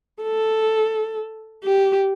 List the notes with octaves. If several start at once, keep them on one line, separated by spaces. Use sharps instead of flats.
A4
G4